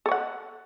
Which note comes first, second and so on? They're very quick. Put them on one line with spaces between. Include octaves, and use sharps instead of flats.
A4 C#5 F#5